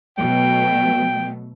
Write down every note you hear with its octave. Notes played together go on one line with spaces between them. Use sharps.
B2 F#3 A3 G5